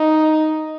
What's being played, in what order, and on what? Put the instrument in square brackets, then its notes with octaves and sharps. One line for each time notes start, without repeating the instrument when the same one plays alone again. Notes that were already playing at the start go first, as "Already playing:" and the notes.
Already playing: [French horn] D#4